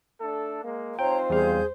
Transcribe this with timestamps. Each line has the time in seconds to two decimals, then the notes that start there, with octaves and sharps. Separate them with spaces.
0.20 A3 D4 A4
0.63 G#3 A#3
0.99 C4 D#4 F4 C5 C#5 G5 A#5
1.30 E2 G3 G#4 F5 G6